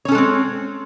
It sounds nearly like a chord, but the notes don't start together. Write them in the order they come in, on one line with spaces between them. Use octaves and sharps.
C#5 C#4 A4 G#3 C4